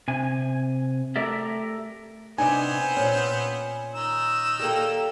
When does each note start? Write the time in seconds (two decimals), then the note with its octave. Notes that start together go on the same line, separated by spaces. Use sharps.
0.08 C3 G#5
1.16 A3 G4 A4 A#4 D5 E5
2.38 C3 B3 C4 D4 D#4 C5 G#5
2.97 A#2 C#4
3.95 D#3 A#5 E6
4.60 G3 A#3 A4